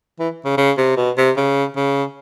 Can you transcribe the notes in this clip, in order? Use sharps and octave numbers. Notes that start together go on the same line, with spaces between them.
E3
C#3
C#3
C3
B2
C3
C#3
C#3